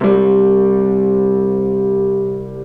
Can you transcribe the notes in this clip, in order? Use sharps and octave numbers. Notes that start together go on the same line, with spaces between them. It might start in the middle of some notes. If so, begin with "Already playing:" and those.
C2 G3